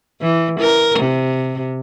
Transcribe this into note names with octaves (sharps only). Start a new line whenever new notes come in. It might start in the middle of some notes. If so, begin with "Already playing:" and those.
E3
A#4
C3